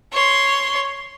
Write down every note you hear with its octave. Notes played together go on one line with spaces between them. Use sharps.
C#5 C6